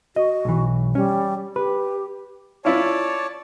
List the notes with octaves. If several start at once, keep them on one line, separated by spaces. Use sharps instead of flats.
F#4 D#5
B1 E3
G3 C#4
G4 B4
C#4 E4 F4 C#5 D5 A5